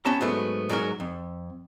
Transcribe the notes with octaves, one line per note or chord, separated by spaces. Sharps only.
B3 C#4 G4 A5 A#5
G#2 F#3 A3 B3
G#2 F#3 F#4 A#4
F2